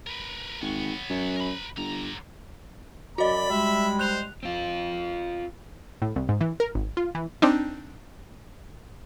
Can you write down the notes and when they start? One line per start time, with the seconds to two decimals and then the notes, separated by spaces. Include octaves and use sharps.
0.07 A#4 B4
0.61 G#1 B3 C#5
1.09 F#2
1.36 A#4 B5
1.77 G1 D3 A#5
3.18 F#2 F#3 F#4 D5 D#5 B5
3.51 G3 G#3 E5
3.99 C5 F#6 F7
4.43 C4 F4
6.02 A2
6.16 C2
6.29 G#2
6.41 E3
6.60 A#4
6.75 G#1
6.97 F4
7.15 E3
7.42 C4 D4 D#4